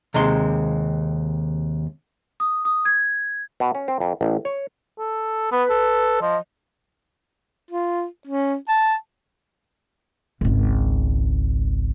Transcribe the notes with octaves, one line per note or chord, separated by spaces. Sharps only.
D#2 C3 G#3 C6
D#6
D#6
G#6
B2
C#4
C4
F2
A1
C#5
A4
B3 B4
A4
F3 D#5
F4
C#4
A5
G#1 C#2